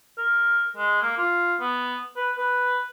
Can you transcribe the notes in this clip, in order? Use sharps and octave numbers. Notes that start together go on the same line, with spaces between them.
A#4
G#3
A#3
F4
B3
B4
B4